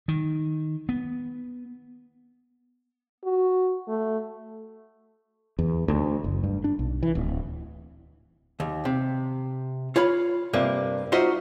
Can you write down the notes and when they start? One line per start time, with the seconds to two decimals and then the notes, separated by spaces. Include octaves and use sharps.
0.08 D#3
0.89 B3
3.24 F#4
3.88 A3
5.59 E2
5.88 D2
6.24 F#1
6.44 G2
6.64 D4
6.79 B1
7.03 E3
7.15 D1
8.60 D#2
8.85 C3
9.96 F4 C#5 F5 B5
10.53 G2 C3 A#3
11.12 D#4 F4 F#4 C5 D#5 E5